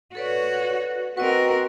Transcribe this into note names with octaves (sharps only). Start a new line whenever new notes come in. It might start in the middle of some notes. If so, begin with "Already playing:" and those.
F#4 A4 B4 C#5 D5
C4 F#4 A#4 B4 D#5